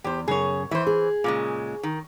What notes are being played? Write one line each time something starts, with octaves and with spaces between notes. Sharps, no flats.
E2 G4 C5
F#2 C#3 G#4 C#5
E3 C5 E5
G#4
A#2 C#3 G#3
D#3